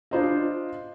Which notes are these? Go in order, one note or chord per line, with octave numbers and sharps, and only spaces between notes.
D4 F4 C5 D#5